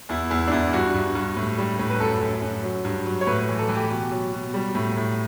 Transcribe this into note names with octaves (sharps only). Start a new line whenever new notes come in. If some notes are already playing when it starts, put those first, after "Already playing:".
E2 E4
E2 E4
D4
E2 E4
G2 F#4
G2
G2
A2
G3
A2
B4
F#2 A4
F#2
F#2
F#3
G2
F#3
C#5
A2 B4
E3
A4
E3
G4
B2
F#3
B2
G3
A2
A2